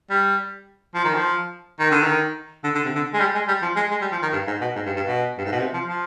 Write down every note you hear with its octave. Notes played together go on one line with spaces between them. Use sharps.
G3
F3
D#3
F3
D#3
D3
D#3
D3
D3
C3
D3
G#3
G3
G#3
G3
F3
G#3
G#3
G3
F3
D#3
G2
G#2
B2
G#2
G2
G2
B2
G2
G#2
B2
C3
F3
F3